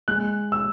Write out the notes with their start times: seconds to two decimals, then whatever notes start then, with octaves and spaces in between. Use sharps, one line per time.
0.08 G#3 F#6
0.52 E6